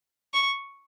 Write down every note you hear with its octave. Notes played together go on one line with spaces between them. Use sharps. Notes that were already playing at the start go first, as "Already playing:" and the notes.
C#6